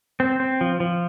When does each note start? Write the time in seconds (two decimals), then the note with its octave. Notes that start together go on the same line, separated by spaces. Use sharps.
0.20 C4
0.40 C4
0.61 F3
0.80 F3